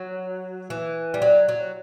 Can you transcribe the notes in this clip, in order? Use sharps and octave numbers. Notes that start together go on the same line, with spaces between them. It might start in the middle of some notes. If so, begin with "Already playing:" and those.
Already playing: F#3
E3
G3
F#3
F#3